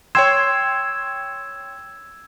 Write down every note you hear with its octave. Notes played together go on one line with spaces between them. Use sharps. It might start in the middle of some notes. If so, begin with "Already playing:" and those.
C#5 G5 C6 E6 G#6 E7